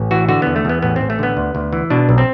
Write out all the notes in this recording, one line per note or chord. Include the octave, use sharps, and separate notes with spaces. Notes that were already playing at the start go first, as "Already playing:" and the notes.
Already playing: A1
E3 F#4
D3 F#4
E2 B3
A3
E2 B3
A1 B3
A1 C4
A3
D3 B3
D2
D2
E3
B2 D4
B1
C4